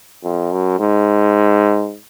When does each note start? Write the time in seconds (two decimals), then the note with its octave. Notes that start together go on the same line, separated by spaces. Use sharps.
0.24 F2
0.52 F#2
0.80 G#2